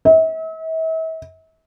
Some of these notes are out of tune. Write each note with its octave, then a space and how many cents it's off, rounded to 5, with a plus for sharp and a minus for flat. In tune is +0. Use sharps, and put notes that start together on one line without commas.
E5 -40